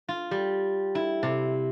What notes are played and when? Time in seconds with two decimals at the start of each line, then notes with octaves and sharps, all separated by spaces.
0.09 F4
0.31 G3
0.95 E4
1.23 C3